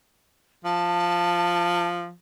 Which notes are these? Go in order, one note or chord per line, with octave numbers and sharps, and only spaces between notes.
F3 A5